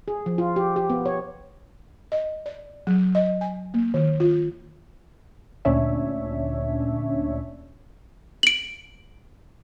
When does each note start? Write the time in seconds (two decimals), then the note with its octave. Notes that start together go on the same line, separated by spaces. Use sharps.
0.08 G#4
0.26 F3
0.38 F4
0.56 G4
0.76 G4
0.90 B3
1.06 C#5
2.12 D#5
2.46 D5
2.87 F#3
3.15 D#5
3.41 G#5
3.74 A#3
3.94 D#3
4.20 F4
5.65 D2 A#2 C#4 D4 C#5 E5
8.43 D7 F#7